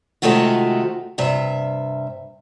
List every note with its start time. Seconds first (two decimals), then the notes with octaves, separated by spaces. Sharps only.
0.22 C3 D#3 G#3 A3 F4 F#4
1.18 G2 C3 E5